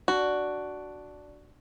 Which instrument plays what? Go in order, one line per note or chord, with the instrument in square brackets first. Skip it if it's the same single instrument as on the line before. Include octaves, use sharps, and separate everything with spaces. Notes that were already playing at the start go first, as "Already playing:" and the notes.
[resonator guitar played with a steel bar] D4 [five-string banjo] F#4